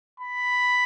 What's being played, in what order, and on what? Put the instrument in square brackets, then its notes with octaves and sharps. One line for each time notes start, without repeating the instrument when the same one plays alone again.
[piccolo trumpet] B5